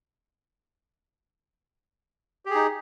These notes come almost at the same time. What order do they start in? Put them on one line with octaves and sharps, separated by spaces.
G4 G#4 D#4